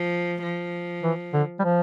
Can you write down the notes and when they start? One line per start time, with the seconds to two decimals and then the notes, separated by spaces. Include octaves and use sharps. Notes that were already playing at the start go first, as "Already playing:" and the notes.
Already playing: F3
0.42 F3
1.03 E3
1.33 D3
1.59 G3
1.64 F3